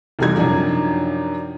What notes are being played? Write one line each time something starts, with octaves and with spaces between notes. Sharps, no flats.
F1 E2 E3 G3 D#4 G#6
F#2 C3 F3 D4 D#4